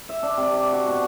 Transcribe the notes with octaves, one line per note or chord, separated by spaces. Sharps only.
E5
D4
C3
D6
F#4
B2